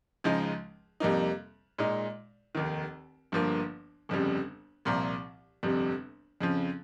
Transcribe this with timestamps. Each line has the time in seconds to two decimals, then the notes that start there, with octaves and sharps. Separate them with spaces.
0.24 C#2 C#3 F3 G#3 D#4
1.00 F2 C3 G3 A#3 D#4
1.78 A#2 G#3 D#4
2.55 F1 D#2 D#3
3.32 G1 G2 F3 A#3
4.09 G1 F2 C#3 G3
4.85 C2 A#2 F3
5.63 G1 F2 C3 G3
6.41 F2 C#3 F3